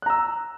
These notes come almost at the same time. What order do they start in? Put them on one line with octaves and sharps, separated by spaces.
F#6 A#5 E6